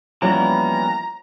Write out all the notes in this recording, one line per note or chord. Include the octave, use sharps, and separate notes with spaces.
E3 F3 G3 A#3 B3 C#4 A#5